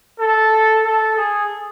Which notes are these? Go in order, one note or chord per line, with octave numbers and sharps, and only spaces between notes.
A4
A4
G#4